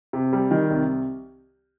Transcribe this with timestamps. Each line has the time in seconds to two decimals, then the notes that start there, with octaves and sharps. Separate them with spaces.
0.13 C3
0.33 G3
0.51 D#3
0.70 C2